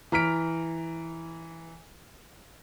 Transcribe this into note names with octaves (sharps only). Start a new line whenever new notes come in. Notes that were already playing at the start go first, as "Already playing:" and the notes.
E3 A#5 F6 B6 D7